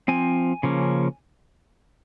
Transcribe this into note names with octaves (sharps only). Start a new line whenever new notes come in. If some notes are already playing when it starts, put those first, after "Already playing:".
F3 C4 G#5
C#3 F3 A#3 C#4